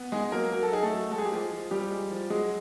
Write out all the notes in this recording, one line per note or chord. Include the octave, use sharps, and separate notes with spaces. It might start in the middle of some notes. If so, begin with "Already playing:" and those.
Already playing: B3
G#3 D#4 G#4
F#3 A#3 A#4
F#3 A#4
A4
D#4 G#4
A3 A4
F#3
G#3 A4
G#4
G4
F3 G#3 G#4
F3
F3 G3 G4
G#3
F3
F#3 G#3 G#4